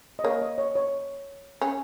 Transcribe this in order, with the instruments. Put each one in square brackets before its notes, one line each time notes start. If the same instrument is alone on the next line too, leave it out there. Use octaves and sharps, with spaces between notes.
[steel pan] D#5
[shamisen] A#3 [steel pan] C#5
[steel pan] D#5
C#5
C#5
[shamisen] C#4